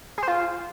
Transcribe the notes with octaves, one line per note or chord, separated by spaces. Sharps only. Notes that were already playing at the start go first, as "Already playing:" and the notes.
G#4
C5
F4